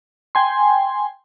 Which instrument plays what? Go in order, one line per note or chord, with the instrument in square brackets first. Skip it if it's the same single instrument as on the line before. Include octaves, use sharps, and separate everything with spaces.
[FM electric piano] G5 G#5 C6